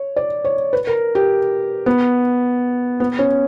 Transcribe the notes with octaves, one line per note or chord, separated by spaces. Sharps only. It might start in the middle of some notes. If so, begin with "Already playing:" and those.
Already playing: C#5
D5
C#5
B4
A#4
G4
B3
B3
C#4